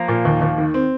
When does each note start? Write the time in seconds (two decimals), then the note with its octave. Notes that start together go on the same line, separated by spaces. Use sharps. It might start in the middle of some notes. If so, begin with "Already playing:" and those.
Already playing: F3 A#3
0.08 A#2
0.25 D#2
0.42 D#2
0.58 D#3
0.74 C4